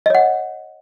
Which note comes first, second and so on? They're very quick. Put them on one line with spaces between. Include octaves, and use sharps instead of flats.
D#5 C#5 F#5